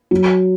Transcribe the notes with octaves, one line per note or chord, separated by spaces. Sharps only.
F#3